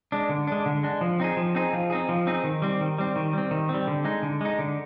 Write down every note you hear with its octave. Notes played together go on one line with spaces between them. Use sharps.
G#3 D4
D3
G#3 D4
D3
G#3 D4
F3
C4 D#4 G#4
F3
C4 D#4 G#4
F3
C4 D#4 G#4
F3
C4 D#4 G#4
D#3
G3 C4
D#3
G3 C4
D#3
G3 C4
D#3
C4
G3
D3
G#3 D#4
D3
G#3 D#4
D3